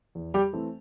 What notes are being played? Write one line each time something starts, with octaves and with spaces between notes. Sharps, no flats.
E2
G3 G4
E3 A3 C4